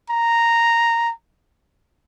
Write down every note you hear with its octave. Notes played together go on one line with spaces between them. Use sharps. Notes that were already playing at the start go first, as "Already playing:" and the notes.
A#5